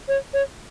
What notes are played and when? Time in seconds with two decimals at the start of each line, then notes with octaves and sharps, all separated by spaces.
0.08 C#5
0.34 C#5